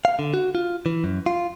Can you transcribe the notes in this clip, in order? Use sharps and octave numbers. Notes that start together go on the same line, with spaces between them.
F5
D3
F#4
F4
E3
F#2
F4